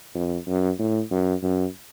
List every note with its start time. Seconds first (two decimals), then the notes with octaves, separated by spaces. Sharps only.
0.15 F2
0.48 F#2
0.79 A2
1.11 F#2
1.43 F#2